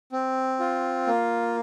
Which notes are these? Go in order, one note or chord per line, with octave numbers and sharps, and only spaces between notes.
C4
F4
A#3